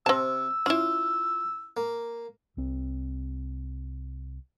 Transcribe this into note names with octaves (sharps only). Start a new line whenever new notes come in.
C3 C4 A5 E6
C#4 E4 F4
A#3
C2 C4